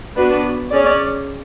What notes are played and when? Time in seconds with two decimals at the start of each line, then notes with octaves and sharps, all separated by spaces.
0.16 B3 D4 F#4 B4
0.70 C#4 G#4 D5